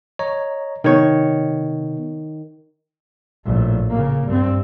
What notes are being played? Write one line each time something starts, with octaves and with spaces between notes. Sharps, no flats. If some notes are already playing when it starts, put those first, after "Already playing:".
C#5 D#5 A#5
C3 D#3 B3 C#5
A#1 A2
C#3 A#3
G2 C4